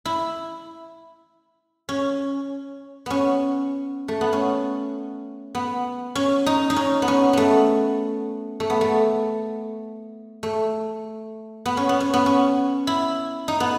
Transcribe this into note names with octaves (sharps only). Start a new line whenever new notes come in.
E4
C#4
B3 C#4
A3
B3
C#4
B3
C#4
D#4
D#4
C#4
B3
C#4
A3 B3
A3
B3
A3
A3
B3
C#4
B3
C#4
B3
C#4
E4
D#4
B3